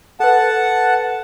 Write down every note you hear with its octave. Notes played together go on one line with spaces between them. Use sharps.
A4 B4 F#5 A5